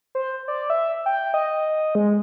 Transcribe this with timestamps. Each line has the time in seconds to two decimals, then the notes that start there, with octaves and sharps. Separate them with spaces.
0.15 C5
0.48 D5
0.70 E5
1.06 G5
1.34 D#5
1.95 G#3